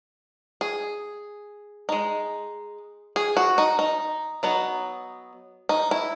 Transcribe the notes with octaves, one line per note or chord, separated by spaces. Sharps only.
G#4
G#3 D#4
G#4
F#4
D#4
D#4
F#3 B3 D#4
D#4
E4